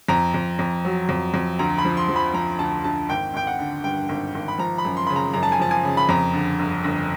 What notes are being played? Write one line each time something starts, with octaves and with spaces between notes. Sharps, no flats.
F2 A#5
F2
F2
F#3
F2
F2
D2 A#5
B5
F3
C6
F3
B5
F3 A#5
D2 A5
D2 A5
G#1 G5
G#1 G5
F#5
D3
G2 G5
G#1
G#1
B5
F3 A#5
B5
F#2
C6
C#3 B5
A#5
F#2 A#5
A5
G#5
F3 A5
G#5
C#3
B5
F2 A#5
D3
G1
G1